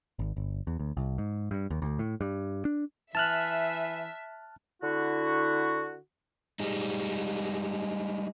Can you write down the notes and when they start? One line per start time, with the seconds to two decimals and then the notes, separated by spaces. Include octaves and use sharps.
0.19 G#1
0.36 G1
0.67 E2
0.79 D2
0.97 C2
1.18 G#2
1.51 G2
1.70 D#2
1.82 D2
1.99 A2
2.21 G2
2.65 D4
3.15 E3 E5 A5 F6 F#6
4.82 D3 E4 F#4
6.60 G3 G#3 D#4